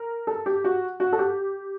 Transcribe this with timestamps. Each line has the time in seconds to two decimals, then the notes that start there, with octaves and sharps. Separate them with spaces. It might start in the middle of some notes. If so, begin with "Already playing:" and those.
Already playing: A#4
0.27 A4
0.46 G4
0.64 F#4
1.00 F#4
1.13 A4
1.19 G4